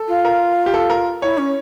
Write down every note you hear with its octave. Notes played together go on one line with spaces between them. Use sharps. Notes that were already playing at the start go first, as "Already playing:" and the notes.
Already playing: A4
F4
A#4
G4
A4
A#4
E4 C#5
C#4